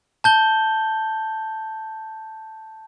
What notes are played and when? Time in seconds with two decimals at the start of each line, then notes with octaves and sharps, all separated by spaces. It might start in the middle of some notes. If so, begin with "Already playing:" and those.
0.24 A5 G6 G7